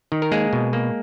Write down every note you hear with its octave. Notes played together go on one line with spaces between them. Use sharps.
D#3
A#4
G#3 A#3 G#4
B2
A#3